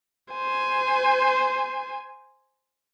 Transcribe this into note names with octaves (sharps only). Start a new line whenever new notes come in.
C5 G#5